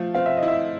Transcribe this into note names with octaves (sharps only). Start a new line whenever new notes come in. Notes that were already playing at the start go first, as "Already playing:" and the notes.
Already playing: F3 A3 F5
C4 F5
E5
D#5
E4
E5